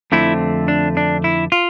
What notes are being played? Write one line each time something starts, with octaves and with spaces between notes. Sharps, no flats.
F2 D3 A3 C4 E4
D4
D4
E4
F4